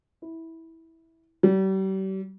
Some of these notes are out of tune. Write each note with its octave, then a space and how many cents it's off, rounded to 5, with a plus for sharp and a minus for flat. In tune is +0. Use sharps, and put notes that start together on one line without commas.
E4 -15
G3 -40